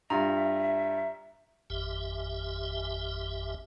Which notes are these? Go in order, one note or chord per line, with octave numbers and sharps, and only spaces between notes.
G2 F4 E5 A#5
G#1 F2 G4 E5